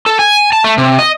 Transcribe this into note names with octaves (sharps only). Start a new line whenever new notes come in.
A4
G#5
A5
A3
C3
D#5